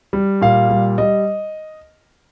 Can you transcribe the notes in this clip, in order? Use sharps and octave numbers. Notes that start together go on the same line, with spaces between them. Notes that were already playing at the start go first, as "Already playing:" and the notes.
G3
A#2 F5
G3
G3 D#5